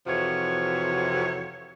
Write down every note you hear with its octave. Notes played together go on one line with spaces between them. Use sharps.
F2 C3 E3 F3 F#4 C#5